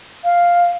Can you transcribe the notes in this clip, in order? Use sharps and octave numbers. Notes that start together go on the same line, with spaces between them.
F5